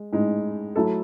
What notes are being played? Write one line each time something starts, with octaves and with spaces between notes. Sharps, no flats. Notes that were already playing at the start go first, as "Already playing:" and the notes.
Already playing: G#3
A2 G#3 D#4
F#3 A3 E4 A4